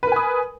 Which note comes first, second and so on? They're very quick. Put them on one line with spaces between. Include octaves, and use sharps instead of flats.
B4 A#4 G#5 D#6